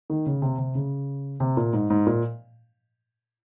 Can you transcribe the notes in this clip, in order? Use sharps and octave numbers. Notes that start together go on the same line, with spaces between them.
D#3
C#3
C3
C3
C#3
C3
A#2
G#2
G#2
A#2